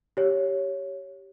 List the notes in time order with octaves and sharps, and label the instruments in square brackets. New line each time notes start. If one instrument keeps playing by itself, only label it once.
[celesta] G4 C#5